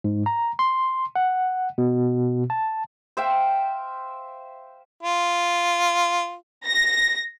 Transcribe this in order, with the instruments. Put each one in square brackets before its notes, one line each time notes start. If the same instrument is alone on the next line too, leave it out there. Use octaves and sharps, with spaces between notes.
[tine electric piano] G#2
A#5
C6
F#5
B2
A5
[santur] C5 E5 F5 G5
[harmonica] F4
[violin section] A#6